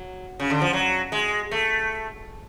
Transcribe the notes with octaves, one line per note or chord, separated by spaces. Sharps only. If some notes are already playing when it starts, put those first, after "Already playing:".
Already playing: F#3
C#3
D3
F3
F#3
G#3
A3